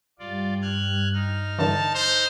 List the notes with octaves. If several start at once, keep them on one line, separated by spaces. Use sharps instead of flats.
G2 G3 F4 D5
F6 F#6 G#6
D#4 F6
G2 D3 E3 A5
C5